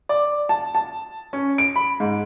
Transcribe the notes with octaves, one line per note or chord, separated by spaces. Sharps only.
D5
A5
A5
C#4
D7
B5
G#2